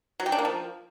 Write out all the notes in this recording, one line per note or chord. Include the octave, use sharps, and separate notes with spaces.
F#3
G4
D4
A#3
F3